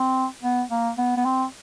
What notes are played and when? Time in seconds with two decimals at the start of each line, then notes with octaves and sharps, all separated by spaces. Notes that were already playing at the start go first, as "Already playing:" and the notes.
Already playing: C4
0.43 B3
0.71 A#3
0.98 B3
1.17 B3
1.25 C4